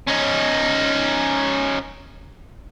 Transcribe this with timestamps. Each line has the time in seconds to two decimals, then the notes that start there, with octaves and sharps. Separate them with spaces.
0.07 C#4 D#4